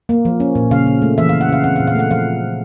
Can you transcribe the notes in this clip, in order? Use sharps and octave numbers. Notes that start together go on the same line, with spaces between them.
A#3
F3
C#4
A#2
C#3 F5
C#3
A3
E3 E5
F5
C#3
F#5
C#3 F5
C4 F#5
F5
A#2
F5
A3 F#5
F3 F5